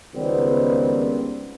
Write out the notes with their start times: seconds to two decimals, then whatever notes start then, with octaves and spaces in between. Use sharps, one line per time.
0.15 C#2 D#3 G3 B3 C4